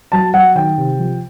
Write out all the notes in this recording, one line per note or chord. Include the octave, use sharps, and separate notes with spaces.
F#3 A5
F#3 F#5
D#3 G5
C3
F3